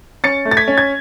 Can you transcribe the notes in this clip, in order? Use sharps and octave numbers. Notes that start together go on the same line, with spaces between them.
C#4 A6 C#7
A3
A6
G#6 B6
C#4
G#6